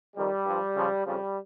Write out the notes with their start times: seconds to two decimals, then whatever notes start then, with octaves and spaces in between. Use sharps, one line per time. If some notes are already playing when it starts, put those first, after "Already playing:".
0.15 F2 D#3 G3
0.46 G2 F3
0.75 C#2 C#3 F3
1.05 F2 C#3 F3 G3